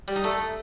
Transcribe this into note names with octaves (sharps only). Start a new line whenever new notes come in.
G3
D#4
A3